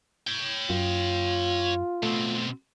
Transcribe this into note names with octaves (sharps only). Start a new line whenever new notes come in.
C#5 G5
F#2 F4
B2 A3 C4